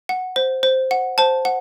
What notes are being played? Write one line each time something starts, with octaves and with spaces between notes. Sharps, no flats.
F#5
C5
C5
F#5
C5 A5
F#5